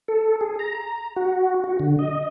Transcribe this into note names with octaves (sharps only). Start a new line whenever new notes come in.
A4
G#4
A#5
A#5
F#4
F#4
D3
D#5